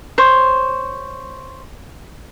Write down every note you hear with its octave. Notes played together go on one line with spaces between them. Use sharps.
C5 C#5